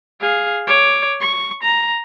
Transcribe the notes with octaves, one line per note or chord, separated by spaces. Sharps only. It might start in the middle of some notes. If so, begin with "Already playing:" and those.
G#4 F5
C#5 D6
C#6
A#5